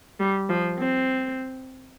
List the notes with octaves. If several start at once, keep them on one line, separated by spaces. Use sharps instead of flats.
G3
F3
C4